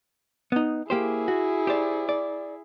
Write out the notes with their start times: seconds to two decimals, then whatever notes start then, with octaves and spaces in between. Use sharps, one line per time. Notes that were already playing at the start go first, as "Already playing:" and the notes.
0.52 B3 D#4
0.90 A#3 E4 G4 G#4 C5
1.28 F#4
1.67 G4 C5 D5
2.09 D5